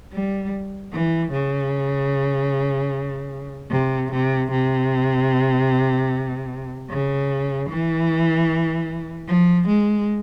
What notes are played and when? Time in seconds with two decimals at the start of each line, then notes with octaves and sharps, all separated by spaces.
0.13 G3
0.93 E3
1.32 C#3
3.71 C3
4.11 C3
4.51 C3
6.90 C#3
7.69 E3
9.28 F3
9.68 G#3